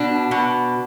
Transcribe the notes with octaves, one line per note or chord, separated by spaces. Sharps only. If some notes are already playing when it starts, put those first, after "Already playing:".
Already playing: B2 D4
B2